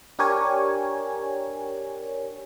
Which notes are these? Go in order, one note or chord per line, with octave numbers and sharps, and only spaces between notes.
D4 G4 A#4 C#5 G#5